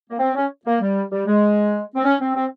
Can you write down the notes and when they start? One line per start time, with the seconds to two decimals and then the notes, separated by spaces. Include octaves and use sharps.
0.10 A#3
0.19 C4
0.35 C#4
0.66 A#3
0.81 G3
1.11 G3
1.27 G#3
1.96 C4
2.04 C#4
2.20 C4
2.35 C4